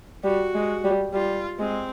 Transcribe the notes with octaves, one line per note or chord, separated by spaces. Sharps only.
G3 F#4
G#3
G3
G3 F4
G#3 C4